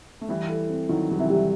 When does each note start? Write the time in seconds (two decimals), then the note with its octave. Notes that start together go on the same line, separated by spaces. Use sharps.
0.21 A3
0.29 E3 G3 E4
0.49 A4
0.69 C4
0.89 D#3 F#3 E4
1.09 F#3 G3
1.19 C3 E3
1.30 G3